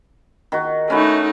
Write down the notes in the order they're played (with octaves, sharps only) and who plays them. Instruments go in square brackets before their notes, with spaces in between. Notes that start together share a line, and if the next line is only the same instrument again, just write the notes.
[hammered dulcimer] D#3 F#4
[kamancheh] A3 D#4 [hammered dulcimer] C#4 E4 F#4